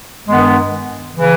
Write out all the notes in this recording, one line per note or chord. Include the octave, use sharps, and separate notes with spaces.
G2 D#3 G#3 B3
C#3 E3